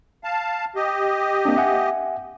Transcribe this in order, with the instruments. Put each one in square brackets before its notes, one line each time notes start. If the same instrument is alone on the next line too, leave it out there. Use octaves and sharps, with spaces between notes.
[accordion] F5 A5
G4 D#5
[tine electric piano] A#3 C4 D4
E5 F#5 G#5